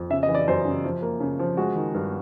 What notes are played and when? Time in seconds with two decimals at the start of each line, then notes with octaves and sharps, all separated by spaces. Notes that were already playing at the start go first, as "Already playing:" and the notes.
Already playing: F2
0.10 C#3 E5
0.23 D#5
0.29 E3
0.34 D5
0.48 F#2 C5
0.65 C#3
0.84 F3
1.02 A#3
1.20 C#3
1.39 F3
1.57 G#3 F#4
1.76 D#3
1.94 G2